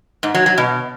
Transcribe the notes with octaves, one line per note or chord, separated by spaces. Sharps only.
G#2
F#3
F#3
B2